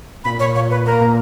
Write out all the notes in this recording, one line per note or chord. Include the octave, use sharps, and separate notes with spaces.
A#2 B5
A#2 C#5
A#2 C#5
A#2 B4
A#3 A#4
A#2